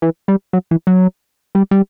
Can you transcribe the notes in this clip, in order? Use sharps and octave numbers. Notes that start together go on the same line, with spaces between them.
E3
G3
F#3
E3
F#3
G3
G3